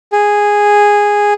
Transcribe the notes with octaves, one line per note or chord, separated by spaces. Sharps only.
G#4